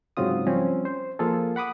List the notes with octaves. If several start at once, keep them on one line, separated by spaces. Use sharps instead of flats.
G#2 C#3 F#3 C4 F4 D#6
F3 G3 C4 C#4
C5
F3 A#3 F4 G#4 A4
F#5 B5 D6 D#6